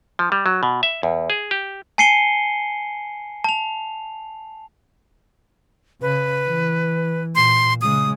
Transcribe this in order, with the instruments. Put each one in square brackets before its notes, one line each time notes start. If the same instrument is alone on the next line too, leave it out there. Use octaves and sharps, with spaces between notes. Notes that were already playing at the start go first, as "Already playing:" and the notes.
[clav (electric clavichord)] F3
G3
F#3
B2
E5
E2
G#4
G4
[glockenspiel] G#5 A5 C7 C#7 D#7 G7
A5 F7
[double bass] C#3 [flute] B4
[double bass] E3
[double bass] A#2 [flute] C6
[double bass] C#3 G#3 [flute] D#6